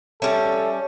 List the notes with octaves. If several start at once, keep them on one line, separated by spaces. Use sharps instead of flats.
G3 C#4 A4 E5